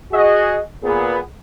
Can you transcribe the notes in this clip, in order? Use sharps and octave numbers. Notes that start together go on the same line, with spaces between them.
F#4 G#4 D#5
A#2 B3 G#4